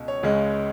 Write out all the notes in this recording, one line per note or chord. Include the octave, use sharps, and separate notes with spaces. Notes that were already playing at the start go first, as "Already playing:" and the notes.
Already playing: C#2 B2
C#5
C#2 C#3 G#3